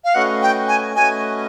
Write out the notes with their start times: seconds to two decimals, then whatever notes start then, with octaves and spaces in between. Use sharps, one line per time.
0.05 F5
0.15 A3 C#4 F#4 B4 D#5 F#5
0.42 G5
0.68 G#5
0.95 A3 C#4 F#4 B4 D#5 G#5